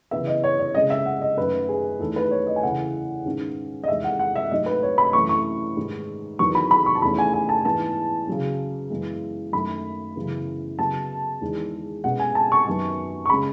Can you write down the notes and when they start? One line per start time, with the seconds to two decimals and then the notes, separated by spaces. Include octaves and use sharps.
0.11 C#3 E3 B3 E5
0.27 D#5
0.44 C#5
0.60 C#5
0.75 C#3 G#3 C#4 D#5
0.90 E5
1.06 F#5
1.22 D#5
1.37 F#2 D#3 A3 C#4 B4
1.69 G#4
2.00 E2 D#3 A3 A4
2.16 B4
2.31 C#5
2.47 D#5
2.56 G#5
2.63 E2 C#3 E3 F#5
3.25 G#2 D#3 G#3 C#4
3.84 D#5
3.88 E2 D#3 G#3 E5
4.04 F#5
4.19 F#5
4.36 E5
4.51 G#2 F#3 A3 D#5
4.66 B4
4.83 C#5
4.98 B5
5.13 F#2 E3 A3 C#4 C#6
5.29 C#6
5.77 G#2 D#3 G#3
6.39 E2 D#3 F#3 B3 C#6
6.55 B5
6.71 B5
6.86 C#6
6.95 A5
7.02 E2 D#3 A3 C#4 B5
7.18 G#5
7.33 G#5
7.49 A5
7.65 G#2 E3 B3 A5
8.27 C#3 F#3 C#4
8.90 F#2 E3 G#3 B3
9.53 F#2 D#3 A3 B5
10.16 F#2 C#3 E3 B3
10.79 C#3 F#3 B3 A5
11.41 E2 D#3 G#3
12.04 B2 G#3 C#4 F#5
12.20 G#5
12.35 A5
12.52 C#6
12.67 F#2 D#3 F#3 B3
13.26 C#6
13.29 C#3 G#3 C#4 B5